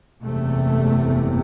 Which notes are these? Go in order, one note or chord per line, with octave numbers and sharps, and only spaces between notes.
F#1 E2 C3 A3